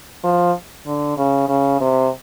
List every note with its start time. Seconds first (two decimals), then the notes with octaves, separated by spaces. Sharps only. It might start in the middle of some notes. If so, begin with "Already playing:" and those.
0.23 F3
0.86 D3
1.17 C#3
1.49 C#3
1.80 C3